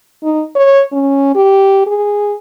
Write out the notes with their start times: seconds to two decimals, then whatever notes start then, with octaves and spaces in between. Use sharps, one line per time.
0.24 D#4
0.56 C#5
0.93 C#4
1.35 G4
1.87 G#4